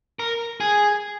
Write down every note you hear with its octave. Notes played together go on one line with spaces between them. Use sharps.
A#4
G#4